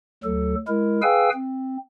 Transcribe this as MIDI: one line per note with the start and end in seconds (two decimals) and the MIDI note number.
0.24 0.55 38
0.24 0.55 54
0.24 0.55 69
0.68 1.01 56
0.68 1.01 64
0.68 1.01 70
1.02 1.30 68
1.02 1.30 71
1.02 1.30 77
1.02 1.30 79
1.02 1.30 80
1.02 1.30 88
1.33 1.77 60